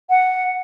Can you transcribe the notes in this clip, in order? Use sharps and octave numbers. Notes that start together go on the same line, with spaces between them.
F#5